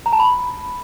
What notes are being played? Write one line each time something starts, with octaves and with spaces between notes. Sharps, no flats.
A#5
A5
B5